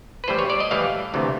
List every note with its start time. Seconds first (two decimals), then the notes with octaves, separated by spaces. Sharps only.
0.24 B4
0.28 A2 E3 G3 C5
0.39 C#5
0.50 D5
0.60 D#5
0.71 A2 E3 G3 F5
1.14 D2 C3 E3 A3